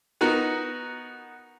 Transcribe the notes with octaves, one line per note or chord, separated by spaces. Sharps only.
B3 D#4 F#4 A#4